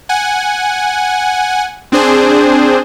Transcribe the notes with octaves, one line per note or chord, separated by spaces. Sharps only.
F#5 G#5
C4 D4 G#4 C5